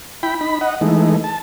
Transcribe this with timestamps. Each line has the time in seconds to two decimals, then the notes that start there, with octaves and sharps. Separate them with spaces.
0.23 E4 G5 B5
0.41 D#4 B5
0.61 D#5 F#5
0.81 E3 G#3 A3 D#4
1.24 A5